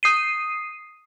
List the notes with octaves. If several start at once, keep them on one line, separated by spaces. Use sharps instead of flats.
D#6 C7 D#7